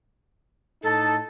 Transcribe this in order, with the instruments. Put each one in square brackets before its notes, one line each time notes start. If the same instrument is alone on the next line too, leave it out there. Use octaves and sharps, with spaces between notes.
[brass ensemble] A2 D#4 A5 [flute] A4